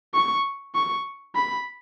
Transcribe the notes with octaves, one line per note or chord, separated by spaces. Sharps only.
C#6
C#6
B5